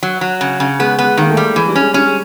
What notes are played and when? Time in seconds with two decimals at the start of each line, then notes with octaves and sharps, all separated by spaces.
0.03 F#3
0.21 F#3
0.41 C#3
0.60 C#3
0.79 G#3 B3
0.99 B3
1.04 G#3
1.17 D#3 A#3
1.31 A3
1.37 G3
1.56 E3 G#3
1.68 G3
1.75 G#3 C#4
1.94 G3 C#4
2.05 G#3